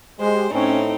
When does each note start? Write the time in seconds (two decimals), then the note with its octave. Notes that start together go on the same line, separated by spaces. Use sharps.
0.20 G#3 G4 C5
0.51 A2 C4 C#4 D#4